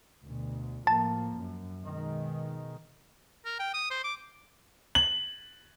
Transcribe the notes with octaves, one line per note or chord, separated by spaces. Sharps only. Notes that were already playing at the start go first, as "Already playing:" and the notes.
D2 B2
A2 F3 A#3 A5
F#2
B2 D#3 G#3
A#4
G5
D#6
C5
D6
F#7